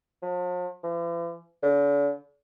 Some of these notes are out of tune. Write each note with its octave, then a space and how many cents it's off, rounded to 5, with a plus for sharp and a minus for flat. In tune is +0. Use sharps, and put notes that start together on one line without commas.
F3 +45
E3 +45
D3 -45